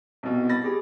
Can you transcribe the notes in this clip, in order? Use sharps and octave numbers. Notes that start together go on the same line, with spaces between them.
C2 B2
B5 A6 A#6
G4 G#4